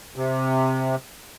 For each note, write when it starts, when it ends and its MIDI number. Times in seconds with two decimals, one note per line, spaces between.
0.16 0.95 48